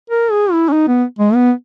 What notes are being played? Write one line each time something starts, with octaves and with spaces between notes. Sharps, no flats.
A#4
G#4
E4
C#4
D#4
B3
G#3
B3